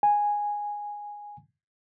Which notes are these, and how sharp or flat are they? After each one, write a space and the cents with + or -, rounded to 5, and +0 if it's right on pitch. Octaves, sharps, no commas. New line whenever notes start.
G#5 -5